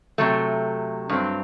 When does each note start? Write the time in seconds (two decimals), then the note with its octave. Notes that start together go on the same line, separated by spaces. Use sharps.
0.18 C3 F#3 A3
1.09 G2 F#3 C4